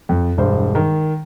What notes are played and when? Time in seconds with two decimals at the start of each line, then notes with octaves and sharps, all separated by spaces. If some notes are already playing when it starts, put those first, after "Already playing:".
0.09 F2
0.37 E1 G2 C5
0.75 D#3